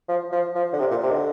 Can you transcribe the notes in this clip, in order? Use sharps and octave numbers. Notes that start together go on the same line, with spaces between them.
F3
F3
F3
D3
C3
A#2
C3
D#3
D3